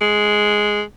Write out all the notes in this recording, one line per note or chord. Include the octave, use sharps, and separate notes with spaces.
G#3